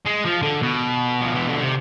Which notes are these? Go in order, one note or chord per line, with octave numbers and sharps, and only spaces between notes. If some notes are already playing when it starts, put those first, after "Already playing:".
G#3
F3
D3
B2
F3
E3
D3
C3